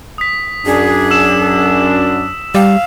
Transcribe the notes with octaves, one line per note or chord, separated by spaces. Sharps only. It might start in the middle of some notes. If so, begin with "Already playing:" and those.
D#6 B6
F#2 D4 G#4
E6 E7
G3 F5